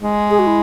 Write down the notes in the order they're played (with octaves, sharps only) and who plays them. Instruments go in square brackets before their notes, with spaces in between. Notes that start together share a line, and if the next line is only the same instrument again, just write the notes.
[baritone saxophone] G#3
[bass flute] G#4
F#4
E4